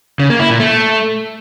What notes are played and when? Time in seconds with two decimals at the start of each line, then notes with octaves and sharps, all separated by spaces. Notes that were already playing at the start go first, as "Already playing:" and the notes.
0.19 C#3
0.30 A#3
0.40 E4
0.50 A#2
0.60 A3